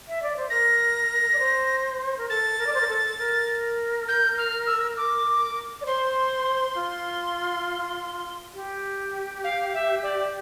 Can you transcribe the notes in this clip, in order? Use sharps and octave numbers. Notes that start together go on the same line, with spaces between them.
E5
D5
C5
A#4 A#6
D5
C5
A#4
A4 A6
A#4
D5
C5
A#4
A4
A#4
G6
F6
E6
D6
D5
C5 C6
F4
G4
F5
E5
D5